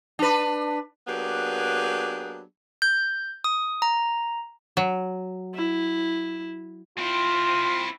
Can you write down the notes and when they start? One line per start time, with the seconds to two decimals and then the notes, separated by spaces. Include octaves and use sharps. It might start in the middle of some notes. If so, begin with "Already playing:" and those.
0.19 D4 B4
1.08 F#3 A#3 B3 D4 G4 G#4
2.82 G6
3.44 D#6
3.82 A#5
4.77 F#3
5.55 E4
6.98 C4 E4 F4